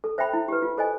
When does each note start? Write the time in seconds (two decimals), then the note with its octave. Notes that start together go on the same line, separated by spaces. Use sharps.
0.04 A4
0.18 C5 E5 G5 B5
0.33 E4
0.48 G4 B4
0.62 F4
0.78 A4 C5 D#5 G#5